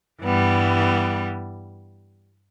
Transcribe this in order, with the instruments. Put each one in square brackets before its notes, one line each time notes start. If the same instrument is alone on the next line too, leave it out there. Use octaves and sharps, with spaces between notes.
[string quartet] G2 E3 G3 B3